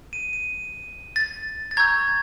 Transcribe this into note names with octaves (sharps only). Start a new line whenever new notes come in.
D#7
D#7
A6
A6
A#5 C#6 E6 G6 G#6